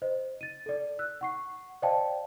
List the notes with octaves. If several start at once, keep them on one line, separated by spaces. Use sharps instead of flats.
C5 D#5
A6 D#7
A4 D5
E6 F#6
F#5 C#6 C7
C5 D5 D#5 F5 G5 A5